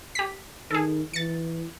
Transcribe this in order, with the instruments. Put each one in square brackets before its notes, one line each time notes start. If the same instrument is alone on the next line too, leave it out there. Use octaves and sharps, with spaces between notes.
[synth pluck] G4 B6
[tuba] D#3 [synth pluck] G#4 A4
[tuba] E3 [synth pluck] A6 C#7